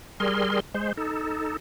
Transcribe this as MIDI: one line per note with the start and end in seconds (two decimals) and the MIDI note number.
0.20 0.60 55
0.20 0.60 68
0.20 0.60 70
0.20 0.60 84
0.74 0.93 56
0.74 0.93 72
0.97 1.57 63
0.97 1.57 69